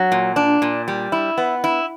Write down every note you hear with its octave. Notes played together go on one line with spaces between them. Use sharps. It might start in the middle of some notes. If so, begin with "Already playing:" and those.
Already playing: F#3
A#2
D4
A#2
G3
E4
B3
E4